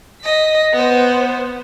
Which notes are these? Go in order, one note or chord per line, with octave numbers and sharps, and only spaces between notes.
D#5 B6
B3 C5